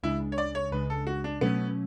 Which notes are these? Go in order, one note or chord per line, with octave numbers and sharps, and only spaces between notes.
C#2 C#3 G#3 D4 E4
C#5
D5
C#5
C#2 C#3 G#3 D4 B4
A4
F#4
D4
B2 F#3 A3 B3 C#4